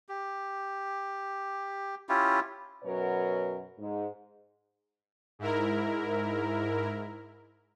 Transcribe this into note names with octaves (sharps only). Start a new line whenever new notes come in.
G4
C#4 E4 F4 G4
F#2 B2 F#3 A#4 B4 C#5
G#2
G#2 E4 A#4